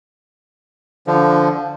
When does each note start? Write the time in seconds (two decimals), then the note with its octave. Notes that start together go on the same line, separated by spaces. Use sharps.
1.07 D3 F3